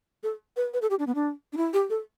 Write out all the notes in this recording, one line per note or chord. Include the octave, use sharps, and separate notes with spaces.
A4
B4
B4
A4
G4
D4
B3
D4
D4
E4
G4
A4